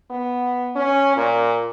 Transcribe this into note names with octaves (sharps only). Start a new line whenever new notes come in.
B3
C#4
A#2